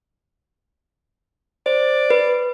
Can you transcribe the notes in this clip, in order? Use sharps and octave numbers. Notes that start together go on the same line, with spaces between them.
C5 D5
B4